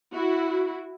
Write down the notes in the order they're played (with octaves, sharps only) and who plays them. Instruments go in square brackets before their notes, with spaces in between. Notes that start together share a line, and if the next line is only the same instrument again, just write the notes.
[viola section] E4 F#4